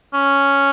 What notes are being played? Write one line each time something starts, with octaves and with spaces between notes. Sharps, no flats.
C#4